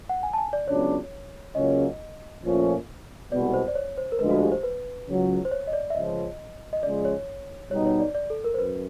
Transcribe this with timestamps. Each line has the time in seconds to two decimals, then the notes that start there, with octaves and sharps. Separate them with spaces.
0.09 F#5
0.23 G#5
0.33 A5
0.38 G#5
0.53 D5
0.68 C#2 C#3 F#3 B3 D4 C#5
1.55 C#2 C#3 F#3 A#3 C#4 D#5
2.43 A#2 F3 A3 C#4
3.31 C2 B2 G#3 B3 D5
3.54 C5
3.68 D5
3.75 C#5
3.98 C5
4.12 A#4
4.19 D2 D3 F3 G#3 B4
4.30 F#4
4.42 G4
4.52 C5
4.63 B4
5.07 C#2 C#3 F#3
5.45 C5
5.51 C#5
5.67 D#5
5.73 D5
5.90 E5
5.95 C#2 C#3 F3 D#5
6.73 D#5
6.83 C#3 F3 G#3 D5
7.05 C#5
7.71 B2 G3 B3 D#4 C#5
7.86 C#5
8.00 D5
8.15 D5
8.30 A4
8.44 A#4
8.54 C5
8.58 F#2 B4